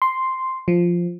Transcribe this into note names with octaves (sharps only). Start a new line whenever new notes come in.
C6
F3